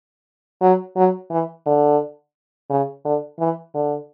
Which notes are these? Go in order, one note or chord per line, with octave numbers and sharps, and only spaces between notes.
F#3
F#3
E3
D3
C#3
D3
E3
D3